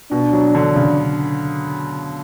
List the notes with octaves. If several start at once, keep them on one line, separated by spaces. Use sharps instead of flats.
B2 D4
F#3
D3
C#3